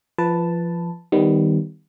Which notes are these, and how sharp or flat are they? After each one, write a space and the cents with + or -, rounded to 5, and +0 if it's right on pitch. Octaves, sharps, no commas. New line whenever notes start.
F3 -25 B4 +0 A5 +0
D#3 +0 G3 +0 B3 +30